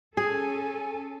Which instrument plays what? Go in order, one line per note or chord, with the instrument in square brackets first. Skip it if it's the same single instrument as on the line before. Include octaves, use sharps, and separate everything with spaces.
[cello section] C#4 A4 [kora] G#4 [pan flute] G#5